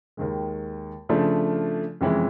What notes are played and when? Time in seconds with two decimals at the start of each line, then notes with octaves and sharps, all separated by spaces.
0.17 D#2 D#3 G#3
1.09 C#3 F3 A3 D4
2.01 F2 C3 E3 G#3 C#4